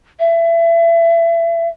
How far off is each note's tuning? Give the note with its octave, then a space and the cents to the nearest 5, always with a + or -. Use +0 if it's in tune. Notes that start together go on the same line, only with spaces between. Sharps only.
E5 +30